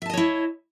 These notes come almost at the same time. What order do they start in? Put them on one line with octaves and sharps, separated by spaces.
E5 A5 D#5 C#5 E4